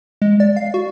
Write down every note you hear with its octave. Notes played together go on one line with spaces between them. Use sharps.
G#3
D5
F5
F#4